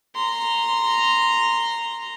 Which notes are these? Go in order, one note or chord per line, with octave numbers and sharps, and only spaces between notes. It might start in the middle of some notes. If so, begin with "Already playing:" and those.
A#5 C6